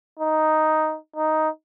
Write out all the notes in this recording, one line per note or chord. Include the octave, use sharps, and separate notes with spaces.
D#4
D#4